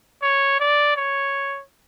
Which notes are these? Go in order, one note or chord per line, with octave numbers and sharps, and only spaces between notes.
C#5
D5
C#5